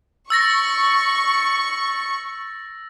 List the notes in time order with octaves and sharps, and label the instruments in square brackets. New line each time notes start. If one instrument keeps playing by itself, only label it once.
[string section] C#6 [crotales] E6 A6 A#6